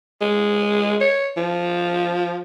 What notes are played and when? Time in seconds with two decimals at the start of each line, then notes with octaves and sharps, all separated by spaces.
0.21 G#3
1.00 C#5
1.37 F3